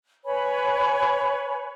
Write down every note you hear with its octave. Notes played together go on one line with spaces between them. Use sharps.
B4 C#5 G#5 B5